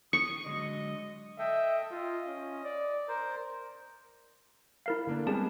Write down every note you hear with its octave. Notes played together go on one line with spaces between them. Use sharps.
C#6 D#6 C#7
D3 F#3 G#3 D#5
A4 D#5 E5 G5
F4 D#5
C#4
D5
A#4 C5
E4 A#4 F5
D3 A#3 D4
G3 G#3 B3 C4 G#4 A5